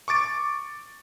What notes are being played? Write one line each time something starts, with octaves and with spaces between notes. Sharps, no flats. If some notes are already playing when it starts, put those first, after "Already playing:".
C#6 D6 A6 D7